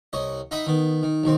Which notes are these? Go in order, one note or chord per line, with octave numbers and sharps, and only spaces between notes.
C2 C#5 D#5
D#4 D#5 E5 F#5 B5 D#6
D#3 B3
D#3
B1 D#3 C4